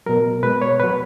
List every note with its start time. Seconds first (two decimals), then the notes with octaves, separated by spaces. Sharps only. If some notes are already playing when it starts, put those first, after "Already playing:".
0.06 B2 F#3 A#4
0.43 B2 G#3 B4
0.62 C#5
0.79 B2 F#3 B4